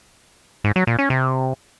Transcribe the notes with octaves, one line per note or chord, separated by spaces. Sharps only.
G#2
F#3
A#2
C#4
C3